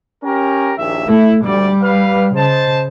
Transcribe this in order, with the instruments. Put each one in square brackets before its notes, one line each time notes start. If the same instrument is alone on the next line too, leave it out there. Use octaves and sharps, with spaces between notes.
[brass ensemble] C#4 G4 A#4
A#1 D#2 E5
[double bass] A3 [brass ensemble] E4
[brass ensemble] D2 D5 [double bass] G3
[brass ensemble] B4 F5
[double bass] C#3 [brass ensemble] C5 D#5 A5